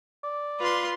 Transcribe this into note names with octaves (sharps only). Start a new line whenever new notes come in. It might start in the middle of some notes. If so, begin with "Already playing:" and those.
D5
F4 B4 C6